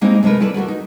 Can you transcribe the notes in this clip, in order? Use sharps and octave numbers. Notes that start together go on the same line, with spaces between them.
G3 G#3 A#3 C4 D#4 E4
C3 G#3 A3 A#4 B4
G3 E4 A4 B4
D2 G3 F#4 A#4
D#4